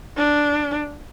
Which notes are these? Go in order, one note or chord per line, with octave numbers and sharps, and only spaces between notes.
D4